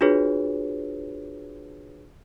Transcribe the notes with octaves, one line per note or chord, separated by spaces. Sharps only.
D4 F4 F#4 G#4 B4 C#5